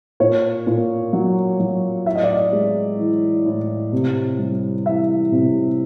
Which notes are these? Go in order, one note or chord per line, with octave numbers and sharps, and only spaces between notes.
A#2 C#5
A#2
F#3
F#3
A2 E5
D#5
D5
D#5
G#3
E3
A2
C3
G3
E3 E5
C3